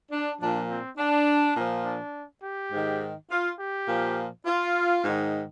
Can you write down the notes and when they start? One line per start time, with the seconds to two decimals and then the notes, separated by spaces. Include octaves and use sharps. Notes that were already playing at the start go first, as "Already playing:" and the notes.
0.11 D4
0.40 A#2 F3 D4
0.69 C4
0.98 D4
1.57 A#2 F3
1.85 D4
2.43 G4
2.72 G#2 D#3
3.30 F4
3.59 G4
3.88 A#2 F3
4.46 F4
5.04 G#2 D#3